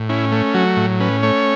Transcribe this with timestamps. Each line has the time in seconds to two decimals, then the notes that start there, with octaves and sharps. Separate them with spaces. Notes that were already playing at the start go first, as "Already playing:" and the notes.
Already playing: A2
0.09 C#4 E4
0.32 A3
0.54 F#3 F#4
0.77 A2
1.00 C#4 B4
1.23 A3 C#5